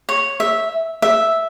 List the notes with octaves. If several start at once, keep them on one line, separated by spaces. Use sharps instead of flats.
C#5
E5
E5